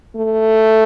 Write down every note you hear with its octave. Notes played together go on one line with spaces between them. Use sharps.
A3